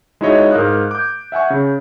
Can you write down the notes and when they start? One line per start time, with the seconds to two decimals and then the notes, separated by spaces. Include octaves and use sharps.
0.21 G#3 D#4 E4 F#4 C#5 D#5
0.51 G#2 A#4 F5 D#6 F#6
0.91 D6 G6
1.32 E5 F#5 G#5 C#6
1.50 C#3